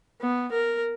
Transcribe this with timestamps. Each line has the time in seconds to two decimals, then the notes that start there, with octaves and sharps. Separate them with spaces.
0.20 B3
0.52 A#4